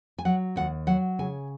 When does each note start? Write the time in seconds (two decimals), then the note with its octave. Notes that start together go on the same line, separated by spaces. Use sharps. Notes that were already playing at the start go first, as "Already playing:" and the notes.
0.18 G#5
0.25 F#3 F#5
0.56 D#2 F#5
0.87 F#3 F#5
1.19 C#3 G#5